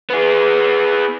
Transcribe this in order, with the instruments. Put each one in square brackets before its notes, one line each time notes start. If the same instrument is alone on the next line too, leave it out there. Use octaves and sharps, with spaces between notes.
[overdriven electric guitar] B3 G#4